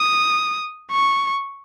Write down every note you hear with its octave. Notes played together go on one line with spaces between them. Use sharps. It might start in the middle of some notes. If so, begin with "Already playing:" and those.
Already playing: D#6
C#6